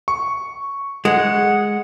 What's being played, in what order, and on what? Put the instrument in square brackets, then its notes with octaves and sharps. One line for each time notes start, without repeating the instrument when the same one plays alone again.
[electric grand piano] C#6
[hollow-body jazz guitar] G#3 [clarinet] F#5